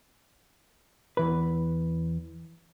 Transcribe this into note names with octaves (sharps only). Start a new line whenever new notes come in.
E2 E3 B4